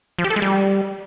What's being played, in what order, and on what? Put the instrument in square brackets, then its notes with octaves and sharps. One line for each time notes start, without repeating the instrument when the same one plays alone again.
[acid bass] F3
G4
A4
G#3
G3